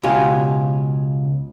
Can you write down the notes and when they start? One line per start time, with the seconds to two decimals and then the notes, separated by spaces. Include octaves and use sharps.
0.03 C#2 B2 G4 F5 G#5